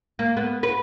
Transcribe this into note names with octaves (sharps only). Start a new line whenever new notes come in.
A#3
B3
B4